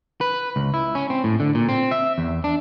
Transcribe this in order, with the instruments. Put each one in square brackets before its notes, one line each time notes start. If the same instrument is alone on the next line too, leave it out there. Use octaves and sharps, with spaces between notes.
[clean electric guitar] B4
C#2
E4
C#4
C4
A2
D3
A#2
C4
E5
E2
D4